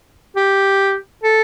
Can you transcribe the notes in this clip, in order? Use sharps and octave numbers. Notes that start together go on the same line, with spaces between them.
G4
A4